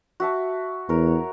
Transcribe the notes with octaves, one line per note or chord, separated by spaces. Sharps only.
F#4 E5 A5
E2 A#4 C#5